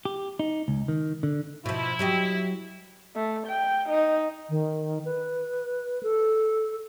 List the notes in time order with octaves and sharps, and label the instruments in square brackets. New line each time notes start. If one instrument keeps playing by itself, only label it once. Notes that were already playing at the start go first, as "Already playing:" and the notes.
[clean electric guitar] G4
D#4
C#2
D#3
D3
[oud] B2 F3 [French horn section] E4
[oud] F#3 G4 D#5
[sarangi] A3
G5
D#4
[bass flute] D#3
B4
A4